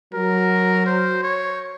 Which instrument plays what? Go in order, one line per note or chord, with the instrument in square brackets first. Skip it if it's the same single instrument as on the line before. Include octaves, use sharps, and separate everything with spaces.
[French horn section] F#3 [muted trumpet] A#4
[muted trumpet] C5
C#5